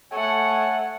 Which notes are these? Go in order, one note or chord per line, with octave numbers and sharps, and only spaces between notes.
A3 C#5 F#5 G#5